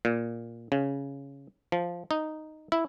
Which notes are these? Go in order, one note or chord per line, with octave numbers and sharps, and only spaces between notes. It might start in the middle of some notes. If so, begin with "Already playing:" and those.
A#2
C#3
F3
D#4
E4